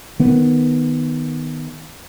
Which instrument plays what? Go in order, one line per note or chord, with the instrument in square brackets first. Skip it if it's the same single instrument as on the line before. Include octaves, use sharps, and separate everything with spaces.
[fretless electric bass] D#3 B3